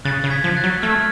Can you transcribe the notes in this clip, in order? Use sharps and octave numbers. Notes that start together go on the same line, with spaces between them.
C#3 F#6 A6
C#3
G#6 B6
F3
F#6 A6
F#3
A3 F6 G#6